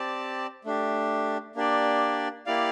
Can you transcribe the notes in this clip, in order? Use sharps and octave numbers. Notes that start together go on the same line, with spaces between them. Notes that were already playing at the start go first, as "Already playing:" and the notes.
Already playing: C4 G4 D5 A5
A3 D4 G4
A#3 D4 G4 D5
A#3 E4 G4 D5 F5